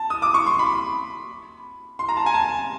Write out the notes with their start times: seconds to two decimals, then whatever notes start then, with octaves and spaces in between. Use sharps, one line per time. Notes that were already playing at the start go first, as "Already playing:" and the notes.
Already playing: A5
0.10 D#6
0.22 D6
0.34 C#6
0.47 C6
0.59 B5
1.99 C6
2.09 A#5
2.17 A5
2.26 G#5
2.34 A5